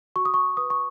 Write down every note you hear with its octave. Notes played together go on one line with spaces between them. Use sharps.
F#4 C#6
D#6
C#6
B4 D#6
C#6